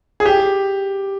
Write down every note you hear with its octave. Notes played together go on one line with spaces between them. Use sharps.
G#4
G4